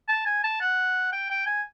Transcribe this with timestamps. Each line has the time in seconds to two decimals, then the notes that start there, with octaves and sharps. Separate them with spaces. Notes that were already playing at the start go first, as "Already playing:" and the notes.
0.08 A5
0.26 G#5
0.44 A5
0.61 F#5
1.13 G5
1.30 G5
1.47 G#5